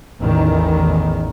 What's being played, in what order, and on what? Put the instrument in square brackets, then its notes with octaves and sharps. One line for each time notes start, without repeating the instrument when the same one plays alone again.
[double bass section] A1 E2 A2 D#3